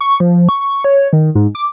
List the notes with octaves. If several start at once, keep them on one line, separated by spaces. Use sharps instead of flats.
C#6
F3
C#6
C#5
D#3
G#2
D6